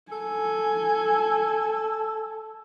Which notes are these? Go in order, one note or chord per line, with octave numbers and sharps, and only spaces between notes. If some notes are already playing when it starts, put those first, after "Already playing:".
A4 G#5